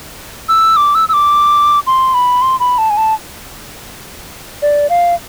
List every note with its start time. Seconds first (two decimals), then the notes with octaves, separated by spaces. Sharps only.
0.49 E6
0.77 D6
0.95 E6
1.09 E6
1.13 D6
1.87 C6
2.14 B5
2.42 C6
2.60 B5
2.78 A5
2.90 G#5
2.97 A5
4.62 D5
4.90 F5